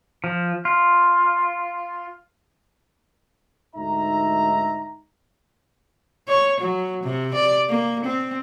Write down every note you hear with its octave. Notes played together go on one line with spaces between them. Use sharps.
F3
F4
D2 G#2 D#4 E5 A#5
C#5
F#3
C3
D5
A#3
C4